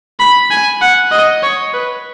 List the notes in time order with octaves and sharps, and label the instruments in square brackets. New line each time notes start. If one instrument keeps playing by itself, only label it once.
[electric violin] B5
G#5
F#5
D#5
C#5
B4